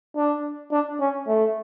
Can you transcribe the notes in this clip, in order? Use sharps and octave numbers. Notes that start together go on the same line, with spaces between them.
D4
D4
C#4
A3